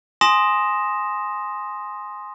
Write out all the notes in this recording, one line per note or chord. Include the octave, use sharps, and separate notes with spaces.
G#5 C6 D#6 A#6 E7